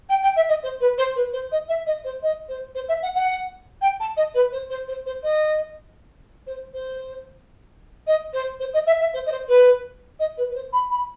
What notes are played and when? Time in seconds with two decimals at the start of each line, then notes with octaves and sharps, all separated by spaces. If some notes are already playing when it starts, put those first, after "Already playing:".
0.09 G5
0.23 G5
0.36 E5
0.49 D#5
0.63 C5
0.80 B4
0.98 C5
1.15 B4
1.33 C5
1.52 D#5
1.69 E5
1.86 D#5
2.04 C5
2.22 D#5
2.49 C5
2.75 C5
2.88 E5
3.02 F#5
3.15 F#5
3.81 G5
4.00 A5
4.17 D#5
4.34 B4
4.52 C5
4.70 C5
4.88 C5
5.06 C5
5.23 D#5
6.47 C5
6.74 C5
8.07 D#5
8.33 C5
8.60 C5
8.73 D#5
8.86 E5
9.00 E5
9.14 C5
9.26 D#5
9.31 C5
9.48 B4
10.19 D#5
10.37 B4
10.50 B4
10.55 C5
10.72 B5
10.90 B5